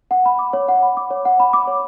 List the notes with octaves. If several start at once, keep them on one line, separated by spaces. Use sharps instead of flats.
F#5
B5
D6
C#5
F#5
B5
D6
C#5
F#5
B5
D6
C#5